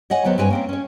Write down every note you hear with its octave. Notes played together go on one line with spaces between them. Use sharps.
C#5 D#5 F#5 G#5
D#2 F#3 B3 C5
G2 C4 B4 C#5 G#5
A#3 C4 C#4
C#4 C#5